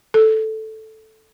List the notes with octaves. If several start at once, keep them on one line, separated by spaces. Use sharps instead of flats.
A4